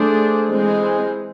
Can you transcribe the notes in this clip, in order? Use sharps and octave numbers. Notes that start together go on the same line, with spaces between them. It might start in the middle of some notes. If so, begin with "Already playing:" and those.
Already playing: A3 D4 G#4 C5
E3 G#3 C4 G#4 C5